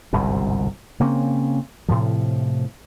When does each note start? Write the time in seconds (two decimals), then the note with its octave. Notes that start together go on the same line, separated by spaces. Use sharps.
0.13 G1 C2 G#2 B2
1.00 C#3 A#3 C4 C#4
1.88 A2 C3 F3